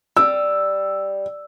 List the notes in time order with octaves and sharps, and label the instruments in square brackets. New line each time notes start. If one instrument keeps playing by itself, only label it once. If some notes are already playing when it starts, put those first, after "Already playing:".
[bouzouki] G3 [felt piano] E6